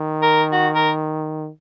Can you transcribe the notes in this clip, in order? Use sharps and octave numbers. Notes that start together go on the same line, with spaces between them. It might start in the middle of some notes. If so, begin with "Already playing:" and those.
Already playing: D#3
A#4
F#4
A#4